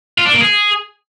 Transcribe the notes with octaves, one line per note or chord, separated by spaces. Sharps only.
F4
D4
A#3
G#4